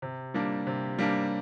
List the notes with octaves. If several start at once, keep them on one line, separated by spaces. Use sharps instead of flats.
C3
G3 A#3 D4
C3
G3 A#3 D4